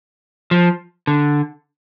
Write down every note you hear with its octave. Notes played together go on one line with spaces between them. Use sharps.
F3
D3